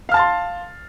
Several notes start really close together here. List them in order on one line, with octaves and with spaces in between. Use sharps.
F5 F6 A5 A6 C6